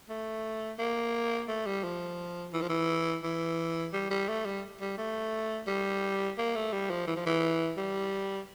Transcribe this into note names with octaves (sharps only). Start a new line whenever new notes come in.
A3
A#3
A3
G3
F3
E3
F3
E3
E3
G3
G3
A3
G3
G3
A3
G3
A#3
A3
G3
F3
E3
F3
E3
G3